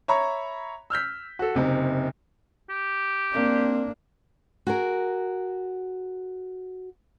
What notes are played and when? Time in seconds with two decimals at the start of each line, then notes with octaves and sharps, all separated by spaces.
0.08 C#5 E5 A#5 B5 C#6
0.90 E6 F6 G6 B6
1.39 F#4 A4
1.55 F#1 C3 D#4
2.70 G4
3.33 A#3 C4 D4
4.67 F#4 G#4 A#4